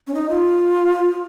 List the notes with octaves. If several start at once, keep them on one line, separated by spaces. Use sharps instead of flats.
C#4
D#4
F4